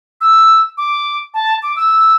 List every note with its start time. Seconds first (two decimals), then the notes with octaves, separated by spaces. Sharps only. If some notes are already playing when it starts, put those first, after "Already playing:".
0.21 E6
0.77 D6
1.34 A5
1.63 D6
1.76 E6